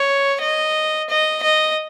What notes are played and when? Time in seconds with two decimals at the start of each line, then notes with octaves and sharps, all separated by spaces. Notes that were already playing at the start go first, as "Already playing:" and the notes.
Already playing: C#5
0.41 D#5
1.09 D#5
1.43 D#5